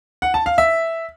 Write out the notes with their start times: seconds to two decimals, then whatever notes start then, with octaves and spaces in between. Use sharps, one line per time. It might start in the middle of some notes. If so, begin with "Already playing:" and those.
0.22 F#5
0.34 A5
0.46 F5
0.58 E5